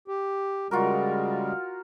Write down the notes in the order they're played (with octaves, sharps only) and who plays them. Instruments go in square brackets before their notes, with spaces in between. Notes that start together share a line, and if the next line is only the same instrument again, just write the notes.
[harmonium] G4
[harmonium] C#3 G3 G#3 [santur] F4 F#4 A#4